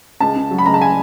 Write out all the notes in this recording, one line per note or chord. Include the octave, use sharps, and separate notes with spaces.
C#2 A5
C#3
F#3
B5
C#2 A#5
A5
G#5